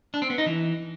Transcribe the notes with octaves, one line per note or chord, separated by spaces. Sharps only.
D4
C4
B3
D#4
E3